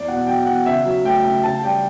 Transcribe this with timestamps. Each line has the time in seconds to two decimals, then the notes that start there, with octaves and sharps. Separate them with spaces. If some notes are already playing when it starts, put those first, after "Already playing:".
Already playing: E2 D5
0.08 B2 F#5
0.27 F#3 G5
0.46 E2 F#5
0.66 C#3 E5
0.85 F#3
1.04 A3 G5
1.25 C#3
1.43 C#3 A5
1.63 G3 G5